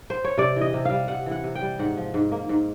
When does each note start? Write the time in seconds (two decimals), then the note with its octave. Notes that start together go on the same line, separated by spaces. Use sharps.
0.10 C5
0.24 C#5
0.37 C3 D5
0.56 E3
0.61 D#5
0.74 C3
0.85 F5
0.91 G3
1.08 C3 F#5
1.26 E3
1.31 F#5
1.43 C3
1.55 G5
1.61 G3
1.79 G#2 F#5
1.97 F3
2.14 G#2
2.32 A#3
2.49 G#2